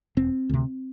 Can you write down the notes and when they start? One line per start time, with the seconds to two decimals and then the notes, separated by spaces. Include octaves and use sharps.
0.17 E1 C4
0.49 D2 C3